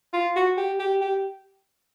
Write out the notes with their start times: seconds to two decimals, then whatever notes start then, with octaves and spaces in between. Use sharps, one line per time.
0.13 F4
0.36 F#4
0.57 G4
0.79 G4
1.01 G4